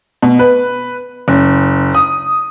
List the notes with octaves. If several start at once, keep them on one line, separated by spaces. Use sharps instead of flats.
B2
B4
F#1
D#6